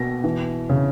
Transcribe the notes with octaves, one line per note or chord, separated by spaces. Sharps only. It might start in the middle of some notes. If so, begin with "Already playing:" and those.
Already playing: B2 A#3 A#6
E3
C#3